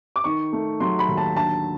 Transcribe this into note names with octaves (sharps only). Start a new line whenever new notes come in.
D6
D#3 C#6
A3
F#3 C6
B5
D#2
A5
D3 A5